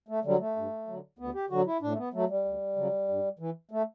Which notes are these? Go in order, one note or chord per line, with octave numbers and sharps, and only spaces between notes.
A3
D3 F#3 G3
A3
G2
D3 F#3
D2 B3
G4
D3 F#3 F#4
E4
A2 D4
A3
B3
F#3 A3
G3
D2
C#3 F#3
G2
E3
A3